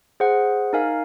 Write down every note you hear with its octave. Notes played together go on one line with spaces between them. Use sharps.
G#4 C5 F#5
D#4 A#4 F5 G#5